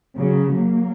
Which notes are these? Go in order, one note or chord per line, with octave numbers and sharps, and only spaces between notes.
C#3 F#3
F#3 A#3